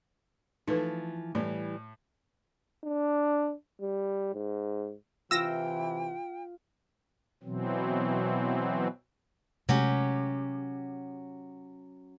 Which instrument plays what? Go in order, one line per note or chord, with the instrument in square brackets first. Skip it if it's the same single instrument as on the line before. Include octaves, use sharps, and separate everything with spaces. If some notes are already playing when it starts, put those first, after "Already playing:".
[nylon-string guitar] E3 F3 [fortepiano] A3 [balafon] D#4 B4
[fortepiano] A2 [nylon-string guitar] E3 G3
[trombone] D4
G3
G#2
[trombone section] C3 E3 [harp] F4 [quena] G5 [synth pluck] E6 A#6
[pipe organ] B2 E3 F#3 C4
[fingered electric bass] C3 G#3 A3 [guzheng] F#3 C#4 G4